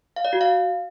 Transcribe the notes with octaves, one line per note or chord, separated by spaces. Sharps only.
F5
D5
F#4
F5